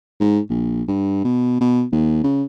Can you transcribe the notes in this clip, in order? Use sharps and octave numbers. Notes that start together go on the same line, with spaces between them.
G#2
A#1
G2
B2
B2
D#2
C#3